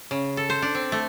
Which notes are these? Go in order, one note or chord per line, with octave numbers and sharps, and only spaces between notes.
C#3
A4
C5
D4
C4
A3